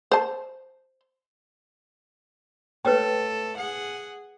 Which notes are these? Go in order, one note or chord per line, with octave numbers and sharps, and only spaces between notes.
C5 A5
A3 A4 B4 C#5 G5
G#4 F#5